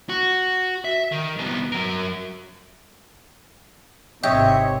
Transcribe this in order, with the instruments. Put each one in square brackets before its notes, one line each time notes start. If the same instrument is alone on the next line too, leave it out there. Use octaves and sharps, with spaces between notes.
[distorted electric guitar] F#4
E5
D#3
C2 B3
F#3 A#4
[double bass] G#1 C3 [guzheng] G4 [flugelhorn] C#5 [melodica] D#5 E5